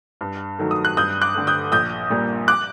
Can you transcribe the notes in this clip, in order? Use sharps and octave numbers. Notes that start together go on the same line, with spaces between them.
G2
D#3 F#3 A3
D#6
F#6
G2 D#6 G6
D6 F#6
D3 A3
D#6 G6
A#1 D#6 G6
A#2 G3 A#3
D6 F#6